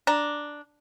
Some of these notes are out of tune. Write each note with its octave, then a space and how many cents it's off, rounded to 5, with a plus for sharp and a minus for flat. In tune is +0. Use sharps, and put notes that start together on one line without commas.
D4 +0 A#5 +0